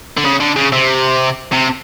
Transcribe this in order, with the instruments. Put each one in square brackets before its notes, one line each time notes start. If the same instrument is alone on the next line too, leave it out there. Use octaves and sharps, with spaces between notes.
[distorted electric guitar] D3
C#3
D3
C#3
C3
C3